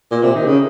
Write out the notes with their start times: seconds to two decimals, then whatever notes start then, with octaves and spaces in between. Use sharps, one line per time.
0.11 A#2
0.23 C3
0.34 D#3
0.47 C#3